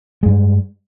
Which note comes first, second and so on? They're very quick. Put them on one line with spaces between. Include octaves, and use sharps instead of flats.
G#3 G2 G3